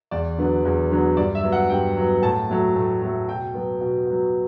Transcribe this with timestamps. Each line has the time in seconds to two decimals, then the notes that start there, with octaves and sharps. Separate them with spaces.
0.11 E2 D5
0.38 D3 F#3 B3
0.65 E2
0.91 D3 F#3 B3
1.17 G2 D5
1.35 E5
1.43 F#3 B3
1.52 F#5
1.70 G2 G5
1.97 F#3 B3
2.22 A2 A5
2.50 F#3 A3
2.76 A2
3.02 F#3 A3
3.29 B2 G5
3.54 F#3 B3
3.80 B2
4.07 F#3 B3